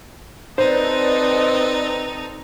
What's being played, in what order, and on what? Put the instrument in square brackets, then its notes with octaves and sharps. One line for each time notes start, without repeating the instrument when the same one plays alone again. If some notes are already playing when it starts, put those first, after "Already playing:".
[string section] C4 A4 D#5 [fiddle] D#4 [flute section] B4 D5 [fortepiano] C5